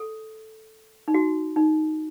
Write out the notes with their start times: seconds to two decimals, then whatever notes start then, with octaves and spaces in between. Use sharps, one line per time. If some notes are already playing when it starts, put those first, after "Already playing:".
Already playing: A4
1.08 D#4
1.14 F#4
1.56 D#4